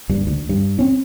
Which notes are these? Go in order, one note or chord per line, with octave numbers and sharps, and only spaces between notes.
F#1 G2
D2
G2
C4 C#4